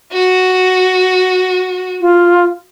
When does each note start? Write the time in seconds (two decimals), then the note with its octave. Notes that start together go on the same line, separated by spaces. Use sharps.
0.12 F#4
2.01 F4